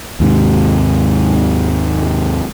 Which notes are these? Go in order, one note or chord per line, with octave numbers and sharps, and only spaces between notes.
D#2 G#2 C3